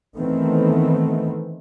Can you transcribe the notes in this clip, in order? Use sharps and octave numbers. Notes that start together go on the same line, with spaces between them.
D#3 E3 A3 B3 C4